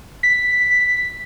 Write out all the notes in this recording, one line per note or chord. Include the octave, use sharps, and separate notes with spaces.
B6